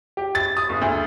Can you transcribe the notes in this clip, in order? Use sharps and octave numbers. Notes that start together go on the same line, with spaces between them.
G4
A6
D#6
F#1
D2